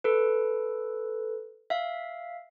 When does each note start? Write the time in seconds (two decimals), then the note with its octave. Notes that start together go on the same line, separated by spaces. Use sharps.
0.04 A4 B4
1.70 E5 F5